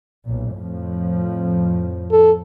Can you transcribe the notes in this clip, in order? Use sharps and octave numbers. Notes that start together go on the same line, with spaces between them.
B1 A#2
F2 A2 F3
A4